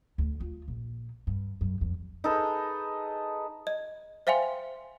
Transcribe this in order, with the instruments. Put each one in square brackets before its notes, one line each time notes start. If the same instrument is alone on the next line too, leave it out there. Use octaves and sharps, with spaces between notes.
[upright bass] D2
F4
A#1
G2
F#2
F2
[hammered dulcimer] D#4 G#4 A4 B4
[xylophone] D#5
C5 E5 F5 G5 G#5 C6